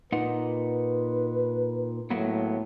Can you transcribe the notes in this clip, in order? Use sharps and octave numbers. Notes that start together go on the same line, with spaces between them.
A#2 D#4 B4 F#5
A2 F#3 A#3 B3